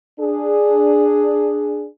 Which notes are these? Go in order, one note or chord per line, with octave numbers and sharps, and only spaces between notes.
D4 G#4